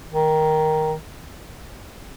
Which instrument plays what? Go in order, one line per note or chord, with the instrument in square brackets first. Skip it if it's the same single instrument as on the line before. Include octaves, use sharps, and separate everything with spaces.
[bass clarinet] D#3